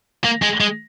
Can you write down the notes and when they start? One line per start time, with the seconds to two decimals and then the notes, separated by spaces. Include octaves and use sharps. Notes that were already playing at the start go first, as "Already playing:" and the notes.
0.24 A#3
0.42 G#3
0.61 G#3